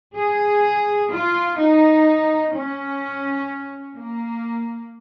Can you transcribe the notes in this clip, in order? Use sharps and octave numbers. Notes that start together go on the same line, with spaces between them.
G#4
F4
D#4
C#4
A#3